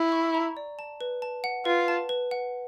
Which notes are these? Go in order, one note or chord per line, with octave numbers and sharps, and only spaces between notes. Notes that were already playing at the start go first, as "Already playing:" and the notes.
Already playing: E4
C#6
A#5
D5
A5
B4
A5
F#5
F4 B4
A5
B4
F#5